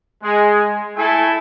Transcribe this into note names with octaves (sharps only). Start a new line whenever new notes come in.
G#3
A3 E4 A4 G#5